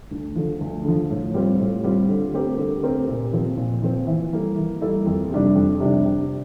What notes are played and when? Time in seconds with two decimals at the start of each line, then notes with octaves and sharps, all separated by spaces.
0.11 D2
0.35 D3 F3
0.61 D2
0.85 D3 F3
1.10 A2
1.34 G3 C4 F4
1.60 A2
1.84 G3 C4 F4
2.09 D3
2.34 A3 C4 G4 A#4
2.59 D3
2.83 A3 C4 G4 A#4
3.08 A#2
3.33 F3 C4
3.57 A#2
3.82 F3 C4
4.07 E3
4.33 G3 A#3 E4 A4
4.57 E3
4.81 G3 A#3 E4 A4
5.06 F2
5.32 C3 G3 D4
5.56 F2
5.80 C3 G3 D4
6.05 C3